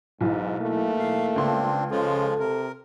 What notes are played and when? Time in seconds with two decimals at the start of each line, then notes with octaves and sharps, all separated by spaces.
0.21 B1 G#2 E3
0.61 A3 A#3
0.99 F5
1.36 C#2 C4 D4 C6
1.91 C#3 F3 G#3 F4 A4
2.39 C3 A#4